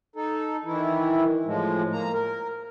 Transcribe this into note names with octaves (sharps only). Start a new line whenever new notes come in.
D#4 A4
D#3 E3 E4
A2 F3 G#3
A#3 A#5
A#4